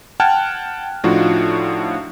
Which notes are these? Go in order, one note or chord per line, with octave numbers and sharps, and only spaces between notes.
F#5 G5 A5 F6 F#6 G#6
A2 F3 D4 D#4 F4 F#4